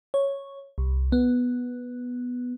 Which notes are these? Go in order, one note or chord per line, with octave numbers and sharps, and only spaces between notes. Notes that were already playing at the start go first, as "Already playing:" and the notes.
C#5
C2
B3